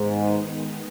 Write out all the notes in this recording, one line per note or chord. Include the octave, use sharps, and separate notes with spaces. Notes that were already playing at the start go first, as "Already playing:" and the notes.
Already playing: G#2 D#3 G#3 B3 D#4